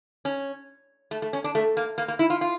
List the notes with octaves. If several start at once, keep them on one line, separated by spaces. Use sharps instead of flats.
C#4
A3
A3
C#4
D4
A3
A#3
A#3
A#3
E4
F4
F4